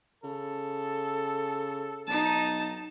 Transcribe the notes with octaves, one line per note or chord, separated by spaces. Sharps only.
C#3 A4
B1 D#4 A5